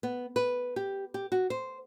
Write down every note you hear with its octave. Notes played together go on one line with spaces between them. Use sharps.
B3
B4
G4
G4
F#4
C5